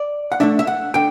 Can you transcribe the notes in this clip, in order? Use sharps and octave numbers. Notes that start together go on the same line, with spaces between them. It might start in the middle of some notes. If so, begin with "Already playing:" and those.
Already playing: D5
F#5
D3 A3 D4 E5
E5
F#5
D3 G5